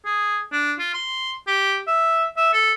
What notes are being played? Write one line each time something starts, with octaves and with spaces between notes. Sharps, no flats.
G#4
D4
F4
C6
G4
E5
E5
A4